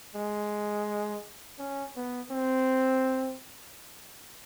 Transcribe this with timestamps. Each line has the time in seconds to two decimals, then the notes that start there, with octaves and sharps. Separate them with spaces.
0.15 G#3
1.59 C#4
1.96 B3
2.31 C4